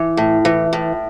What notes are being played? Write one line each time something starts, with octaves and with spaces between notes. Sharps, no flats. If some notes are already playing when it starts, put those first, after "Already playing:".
Already playing: E3
A2
E3
A2